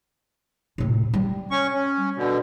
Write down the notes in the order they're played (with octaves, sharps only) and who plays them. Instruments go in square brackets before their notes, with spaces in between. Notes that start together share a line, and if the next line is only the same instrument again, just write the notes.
[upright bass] A2 C3
G3
[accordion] C#4 C#6
C#4
B2 D3